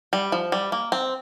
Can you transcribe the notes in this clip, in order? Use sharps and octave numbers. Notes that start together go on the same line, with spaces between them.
G3
F3
G3
A#3
C4